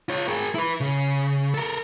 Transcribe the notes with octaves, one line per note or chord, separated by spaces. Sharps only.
F4 C#5
G#4 A#4
E4 B4
C#3
A4 A#4